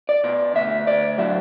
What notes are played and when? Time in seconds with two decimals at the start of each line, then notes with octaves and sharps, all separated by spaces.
0.09 D5
0.24 B2
0.55 D2 E5
0.87 D2 D5
1.18 F#3 E5